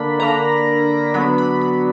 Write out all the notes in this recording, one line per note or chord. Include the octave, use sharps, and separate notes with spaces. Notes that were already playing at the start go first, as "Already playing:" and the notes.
Already playing: D3 A#3 D4 B5
D3 A#3 D4 A#5
D3 F#3 B3 D4 B5
B5
B5